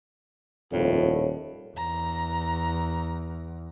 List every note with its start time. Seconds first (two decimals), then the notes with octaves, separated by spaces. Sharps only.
0.73 D#1 F2 A2
1.76 E2 A#5